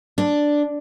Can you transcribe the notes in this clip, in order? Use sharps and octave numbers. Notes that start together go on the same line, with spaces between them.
D4